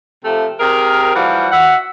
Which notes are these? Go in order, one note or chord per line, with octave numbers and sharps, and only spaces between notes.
C3 F3 A3
C3 G#4 A#4
E3 F3 G3 F#4
F#4 E5 F#5